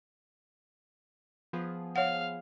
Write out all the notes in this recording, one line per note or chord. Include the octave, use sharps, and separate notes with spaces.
F3 B3 G#4
C#5 F5 F#5